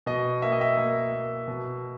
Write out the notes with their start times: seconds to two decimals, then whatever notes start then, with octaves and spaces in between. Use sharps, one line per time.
0.06 B2 D#5
0.42 A#3 E5
0.52 D#5
0.61 E5
0.77 A#3
1.12 A#3
1.48 B2